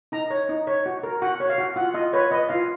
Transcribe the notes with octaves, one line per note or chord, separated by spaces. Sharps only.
D#4 A#5
C#5
D#4
C#5
F#4
A#4
F#4 F#5
C#5
F5
F#4
F4 F#5
F4 D#5
B4 C#5
B4 D#5
F4 F5